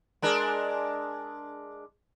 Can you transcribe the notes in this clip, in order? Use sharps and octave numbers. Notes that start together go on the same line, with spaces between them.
G#3 D4 A#4